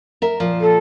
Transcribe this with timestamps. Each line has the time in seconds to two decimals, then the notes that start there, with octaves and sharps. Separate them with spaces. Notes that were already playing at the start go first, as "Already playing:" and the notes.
0.22 A#4 E5
0.40 A#2 F3
0.60 A4